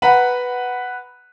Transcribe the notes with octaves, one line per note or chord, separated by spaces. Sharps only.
B4 F#5 A#5 B5